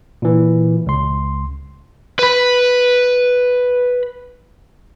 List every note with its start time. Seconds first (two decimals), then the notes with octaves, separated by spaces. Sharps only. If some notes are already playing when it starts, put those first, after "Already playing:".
0.22 A#2 E3
0.87 C#2 C6
2.19 B4 B5